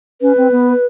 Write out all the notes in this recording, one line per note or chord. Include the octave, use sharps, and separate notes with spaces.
C#4 B4
C4
B3